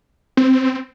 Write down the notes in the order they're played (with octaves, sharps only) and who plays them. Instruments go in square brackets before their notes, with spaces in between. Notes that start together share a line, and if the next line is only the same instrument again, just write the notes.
[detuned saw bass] C4